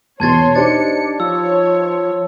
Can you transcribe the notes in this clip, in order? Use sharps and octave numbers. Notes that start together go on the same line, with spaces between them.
E2 B2 C#5 A5 C6 G#6 A6
D4 D#4 G4 C5 A6 C#7
F3 C#5 E6